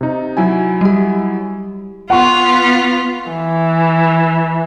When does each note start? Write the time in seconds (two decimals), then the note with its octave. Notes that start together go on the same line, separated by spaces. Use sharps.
0.01 C3 D#4
0.37 F#3 E4 G#5
0.81 G3 G4
2.10 B3 F4 F#5 C#6
3.31 E3